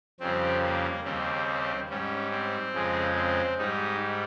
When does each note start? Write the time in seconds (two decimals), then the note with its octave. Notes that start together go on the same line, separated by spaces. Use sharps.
0.20 F2 C#3 G3 C4
0.62 A#3
1.04 D#2 C#3 G3 C4
1.89 G#2 G3 C#4
2.31 C4
2.73 F2 C#3 G#3
3.16 C4
3.58 G#2 G3 D#4